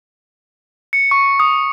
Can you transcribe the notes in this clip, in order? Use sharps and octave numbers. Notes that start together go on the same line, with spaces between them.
C#7
C#6
D#6